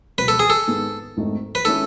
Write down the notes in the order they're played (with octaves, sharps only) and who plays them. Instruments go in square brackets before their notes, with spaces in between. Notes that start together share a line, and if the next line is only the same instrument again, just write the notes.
[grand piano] C#2 B2 F#3 [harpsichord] B4
[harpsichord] A4
G#4
A4
[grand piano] G#2 D#3 G#3 B3
G#1 G#2 D#3 A3 D#4
[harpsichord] B4
[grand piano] D#3 G#3 C#4 E4 [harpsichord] A4